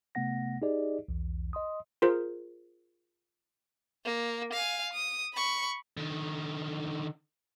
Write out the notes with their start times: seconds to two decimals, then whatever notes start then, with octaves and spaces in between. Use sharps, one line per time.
0.15 C3 A3 B3 F#5 A#6
0.62 D#4 G4 G#4 D5 D#5
1.09 B1 E2 E3
1.53 D#5 C6 D#6
2.02 F4 G#4 A#4 C5
4.05 A#3
4.53 F5 G#5
4.93 D#6
5.34 B5 C#6
5.97 D3 D#3